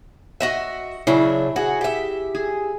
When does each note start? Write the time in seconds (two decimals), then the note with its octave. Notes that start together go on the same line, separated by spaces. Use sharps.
0.40 F#4 D#5 E5
1.07 C#3 F#3 D4 E4
1.56 F#4 G#4
1.81 G4 E5
2.35 G#4